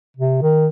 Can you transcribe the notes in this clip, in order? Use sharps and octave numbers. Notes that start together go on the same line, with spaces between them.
C3
D#3